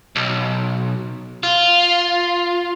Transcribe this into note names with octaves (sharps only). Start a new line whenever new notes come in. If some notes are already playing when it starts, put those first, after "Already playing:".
B1
F4